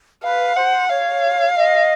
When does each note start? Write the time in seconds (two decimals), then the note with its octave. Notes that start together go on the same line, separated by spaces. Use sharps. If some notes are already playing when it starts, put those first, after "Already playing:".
0.23 B4 F5
0.56 C5 F#5
0.89 C#5 F5
1.55 D#5